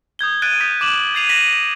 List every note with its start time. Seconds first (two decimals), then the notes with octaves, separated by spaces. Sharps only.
0.19 D#6 G6 G#6 G7
0.42 F#6 G#6 A6 D7 D#7 G7
0.60 D#6 G6 B6
0.81 D6 E7 F#7
1.15 G#6 A6 C7 D#7 F7
1.29 A#6 B6 D#7 E7 F#7